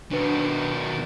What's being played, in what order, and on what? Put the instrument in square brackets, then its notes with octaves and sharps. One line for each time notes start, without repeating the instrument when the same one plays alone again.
[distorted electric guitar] B2 D#3 [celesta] D4 B4 C#7